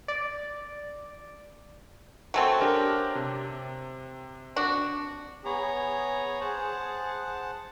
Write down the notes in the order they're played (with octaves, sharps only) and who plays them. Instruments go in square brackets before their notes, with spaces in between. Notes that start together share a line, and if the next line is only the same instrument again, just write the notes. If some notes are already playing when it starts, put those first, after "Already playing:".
[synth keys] D5
[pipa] F#3 A3 C4 [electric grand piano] F#5 G#5 A5
[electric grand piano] D4 G4 A#4
C3
[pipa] D4 F#4
[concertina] B3 C#5 A#5 [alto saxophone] G#4
[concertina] C5 F#5 A5